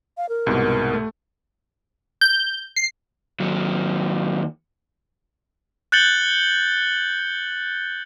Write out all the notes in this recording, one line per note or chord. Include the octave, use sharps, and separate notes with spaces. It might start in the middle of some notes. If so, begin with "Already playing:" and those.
F5
A#4
C2 G#2 B2
A3
G6
C7
D#2 F#3
F#6 G6 A6 C#7 F#7 G7